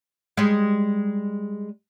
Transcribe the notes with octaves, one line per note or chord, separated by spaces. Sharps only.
G3 G#3